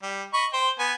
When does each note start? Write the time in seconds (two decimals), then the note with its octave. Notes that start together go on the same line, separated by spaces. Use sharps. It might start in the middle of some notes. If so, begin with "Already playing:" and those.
0.03 G3
0.33 D#5 B5 C#6
0.53 C5 G5
0.79 B3 G#5